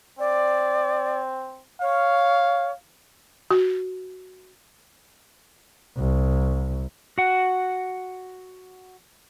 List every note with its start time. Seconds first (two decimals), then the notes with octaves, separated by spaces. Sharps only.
0.19 C4 D5
1.82 C#5 F5
3.51 F#4
5.98 C2
7.18 F#4 F#5